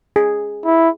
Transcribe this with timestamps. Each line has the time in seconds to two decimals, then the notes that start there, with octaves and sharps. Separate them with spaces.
0.16 G#4
0.65 E4